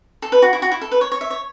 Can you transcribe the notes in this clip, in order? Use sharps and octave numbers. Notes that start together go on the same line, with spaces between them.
A4
B4
F#4
E4
F#4
E4
A4
B4
C#5
C#5
E5
C#5